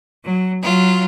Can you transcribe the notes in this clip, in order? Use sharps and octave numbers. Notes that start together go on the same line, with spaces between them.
F#3
F#3 F4